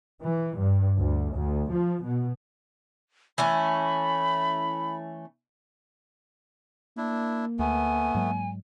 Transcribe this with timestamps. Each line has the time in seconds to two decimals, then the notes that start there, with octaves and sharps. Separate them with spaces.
0.22 E3
0.57 G2
0.97 D2
1.35 D2
1.72 F3
2.04 B2
3.38 E3 A3 C#4 B5
6.97 A#3 D4 E4
7.59 D2 A3 B3 G#5
8.15 G#2 F#3 G#3